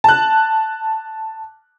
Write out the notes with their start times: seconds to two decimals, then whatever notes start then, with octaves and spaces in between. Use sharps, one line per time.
0.04 A5 F#6